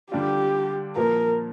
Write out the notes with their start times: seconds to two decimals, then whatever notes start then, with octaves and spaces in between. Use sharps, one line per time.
0.12 D3 G3 D4 F4 G4
0.96 A#2 F3 A#3 A#4